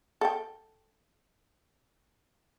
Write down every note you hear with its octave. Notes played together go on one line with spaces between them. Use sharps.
A4 F#5 G5